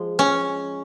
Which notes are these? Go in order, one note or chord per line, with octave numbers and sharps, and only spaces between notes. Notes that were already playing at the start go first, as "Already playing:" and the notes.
Already playing: F3 G#3
C#4